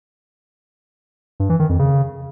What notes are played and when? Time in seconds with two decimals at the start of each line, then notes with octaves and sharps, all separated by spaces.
1.40 G2
1.50 E3
1.59 D#3
1.69 F2
1.79 C#3